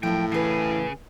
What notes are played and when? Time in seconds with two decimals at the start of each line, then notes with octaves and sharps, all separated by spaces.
0.03 F#2 A2 F3 G5
0.32 C#3 E3 G#4 B4